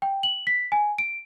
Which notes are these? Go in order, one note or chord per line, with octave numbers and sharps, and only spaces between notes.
G5
F#7
B6
G#5
D7